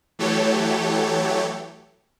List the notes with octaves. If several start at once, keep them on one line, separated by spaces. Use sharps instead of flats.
E3 F#3 A3 G4 A4 C#5